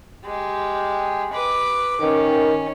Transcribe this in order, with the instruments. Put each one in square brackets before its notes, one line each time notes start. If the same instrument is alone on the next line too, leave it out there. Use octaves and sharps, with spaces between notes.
[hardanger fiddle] G#3 G4
B4 D6
[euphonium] D#3 [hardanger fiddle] C#4